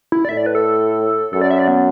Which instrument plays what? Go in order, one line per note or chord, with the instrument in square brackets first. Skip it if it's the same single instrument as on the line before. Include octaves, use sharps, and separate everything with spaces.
[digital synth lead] E4
D5
[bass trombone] A2 [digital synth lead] E5
[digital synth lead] D5
B4
A4
[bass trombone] F#2 [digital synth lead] A4
[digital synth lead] D5
E5
D5
B3